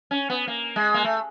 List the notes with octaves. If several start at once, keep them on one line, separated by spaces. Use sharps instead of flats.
C#4
B3
A#3
G#3
A#3
A3